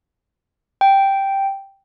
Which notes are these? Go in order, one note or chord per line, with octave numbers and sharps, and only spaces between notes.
G5